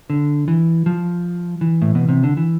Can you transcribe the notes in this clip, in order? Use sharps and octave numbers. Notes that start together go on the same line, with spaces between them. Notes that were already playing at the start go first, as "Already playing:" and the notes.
D3
E3
F3
E3
A2
B2
C3
D3
E3